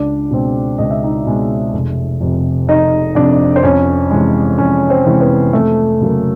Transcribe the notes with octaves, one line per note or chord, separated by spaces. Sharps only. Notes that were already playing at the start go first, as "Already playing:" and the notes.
Already playing: C#2 D4 D5
B2 G#3 C4
C#2 D#5
E5
D#4 D#5
B2 G#3 C4
F1
F2 C3
F1 D#4 D#5
F2 C3 D4 D5
C5
F2 C#4 C#5
C3 E3 G#3
F2 C#4 C#5
C4 C5
C3 E3 G#3
B3 B4
F2 A3 A4
C#3 F#3 A#3